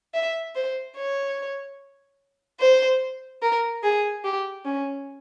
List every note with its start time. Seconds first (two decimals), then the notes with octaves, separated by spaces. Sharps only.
0.14 E5
0.55 C5
0.96 C#5
2.60 C5
3.42 A#4
3.83 G#4
4.24 G4
4.65 C#4